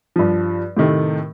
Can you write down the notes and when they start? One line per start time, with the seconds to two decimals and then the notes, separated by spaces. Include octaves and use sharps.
0.16 G2 F3
0.77 A2 C3 D#3 A3